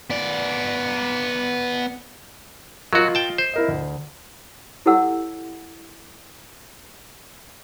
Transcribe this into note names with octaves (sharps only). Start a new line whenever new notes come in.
B3 D5
F#3 F4 F#4 A#4 D#5
G5 A5
C5
E4 A#4 D#5
D2
E4 G4 A4 C#5 F#5 E6